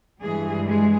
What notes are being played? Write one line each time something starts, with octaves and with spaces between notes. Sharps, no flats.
G2 E3 G3 G#3 G#4
G#3 G#4